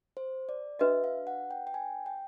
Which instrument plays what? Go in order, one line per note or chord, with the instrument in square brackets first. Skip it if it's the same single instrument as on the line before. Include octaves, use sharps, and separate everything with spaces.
[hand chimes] C5
D5
[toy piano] D4 F#4 B4 D#5 [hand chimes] E5
[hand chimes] F5
F#5
G5
G5
G#5
G5